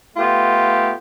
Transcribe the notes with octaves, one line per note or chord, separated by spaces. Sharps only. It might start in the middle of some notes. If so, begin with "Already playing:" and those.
A3 B3 F4 G4